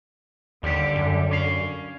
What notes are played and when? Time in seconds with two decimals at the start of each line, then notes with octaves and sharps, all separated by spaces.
0.63 D#2 D3 G3 G4
0.96 F#2
1.31 C#4 F5